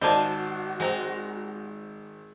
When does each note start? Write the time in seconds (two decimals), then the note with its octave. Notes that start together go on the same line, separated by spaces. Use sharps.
0.01 G#1 F#4 C5 D5 D#5 F5 G#5 A5
0.80 G#3 C4 A#5